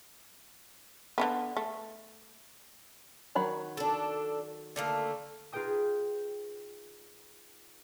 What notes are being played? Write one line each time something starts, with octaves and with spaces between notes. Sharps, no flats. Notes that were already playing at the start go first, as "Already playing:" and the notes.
D3 E3 B3
A3
D#3 F#3 B5
D4 A4
D3 A3 A#3
D#4 F4 G#4 B4 G5 D#6